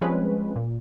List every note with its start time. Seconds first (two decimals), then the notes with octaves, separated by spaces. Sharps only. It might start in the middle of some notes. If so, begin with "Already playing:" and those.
0.01 F3 G3 G#3 C4 C#4 B4
0.56 A#2